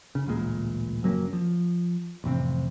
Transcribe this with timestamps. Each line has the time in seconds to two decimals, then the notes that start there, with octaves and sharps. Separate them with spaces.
0.15 C#3
0.27 A1 D2 A#2 G#3
1.03 F#1 F#3 A#3 C#4
1.33 F3
2.24 A1 F2 C3 C4